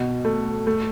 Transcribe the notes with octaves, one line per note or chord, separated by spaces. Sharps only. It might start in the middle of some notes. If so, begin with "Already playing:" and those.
Already playing: B2
A3
A3